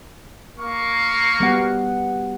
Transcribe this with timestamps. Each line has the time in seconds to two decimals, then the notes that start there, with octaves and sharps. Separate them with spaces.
0.58 A#3 F5 C#6
1.40 G3 B3 F#5